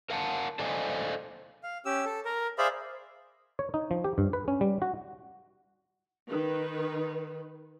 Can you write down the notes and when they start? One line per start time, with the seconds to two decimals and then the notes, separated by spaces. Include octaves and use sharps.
0.10 A#4 F5 F#5 A5
0.59 A4 C5 D5 D#5 F5 G#5
1.63 F5
1.85 C#4 G4 E6
2.05 A4
2.25 A#4
2.58 G#4 C5 D5 E5 F5 B5
3.59 C#5
3.74 D#4
3.91 F3
4.04 G4
4.18 G2
4.33 B4
4.48 C#4
4.61 G3
4.82 F#4
6.28 D#3 B4